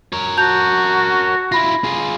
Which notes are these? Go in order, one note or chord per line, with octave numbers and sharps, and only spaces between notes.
A#4 C#5
F#4 A5 G6 F7
E4 F4 B5 A#6
F4 G#4